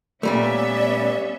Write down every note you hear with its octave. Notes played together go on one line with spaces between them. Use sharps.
A#2 G3 A3 B3 C#4 D5 E5